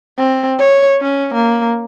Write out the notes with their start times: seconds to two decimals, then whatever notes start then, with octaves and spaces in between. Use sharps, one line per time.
0.18 C4
0.59 C#5
1.01 C#4
1.34 A#3